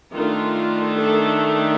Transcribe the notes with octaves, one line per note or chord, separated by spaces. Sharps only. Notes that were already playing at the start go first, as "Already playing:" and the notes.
D#3 A3 D4 F4
A4